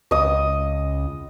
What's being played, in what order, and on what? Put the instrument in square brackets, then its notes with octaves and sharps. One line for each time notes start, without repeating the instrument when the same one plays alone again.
[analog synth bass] C#2 [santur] D#5 D#6